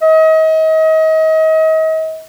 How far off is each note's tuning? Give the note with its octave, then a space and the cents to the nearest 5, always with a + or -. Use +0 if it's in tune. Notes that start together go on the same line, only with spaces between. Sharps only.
D#5 +35